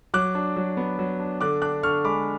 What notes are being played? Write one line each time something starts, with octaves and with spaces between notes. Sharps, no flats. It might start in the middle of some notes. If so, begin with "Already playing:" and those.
F#3 D6 F#6
D4
F#3
B3
F#3
D4
D3 D6 F#6
D4 D6 F#6
D3 C#6 F6
G#3 B5 D6